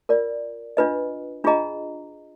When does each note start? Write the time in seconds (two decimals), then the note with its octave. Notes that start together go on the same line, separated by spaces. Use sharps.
0.09 F4 A#4 D5
0.77 D4 F4 B4 D#5
1.44 D4 F4 G#4 D#5 A#5